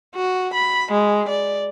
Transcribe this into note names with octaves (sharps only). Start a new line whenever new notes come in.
F#4
B5
G#3
D5